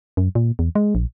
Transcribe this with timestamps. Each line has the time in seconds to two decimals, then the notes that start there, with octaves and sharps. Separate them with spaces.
0.17 F#2
0.35 A#2
0.59 E2
0.75 G#3
0.95 A#1